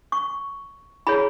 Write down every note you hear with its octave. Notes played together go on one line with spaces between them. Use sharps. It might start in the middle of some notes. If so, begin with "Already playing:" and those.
C#6
E4 G#4 C#5 B5